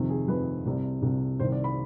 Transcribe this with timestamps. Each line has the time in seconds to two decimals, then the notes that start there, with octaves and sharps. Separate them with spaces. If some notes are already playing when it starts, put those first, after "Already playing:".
Already playing: F2 C3 D#3
0.09 G#4
0.28 F2 C3 D#3 B4
0.65 C2 C3 G3
1.02 C2 C3 G3
1.39 C2 C3 D#3 G3 C5
1.52 D5
1.64 B5